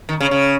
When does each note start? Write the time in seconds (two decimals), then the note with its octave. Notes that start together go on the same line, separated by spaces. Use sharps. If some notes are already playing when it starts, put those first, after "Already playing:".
0.09 D#3
0.20 C#3
0.31 C#3